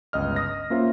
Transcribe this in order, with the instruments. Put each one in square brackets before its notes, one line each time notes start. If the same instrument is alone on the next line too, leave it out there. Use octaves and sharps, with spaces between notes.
[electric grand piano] G1 C#2 D#5 F6
D#6 A#6
A#3 C#4 F4 C5 E5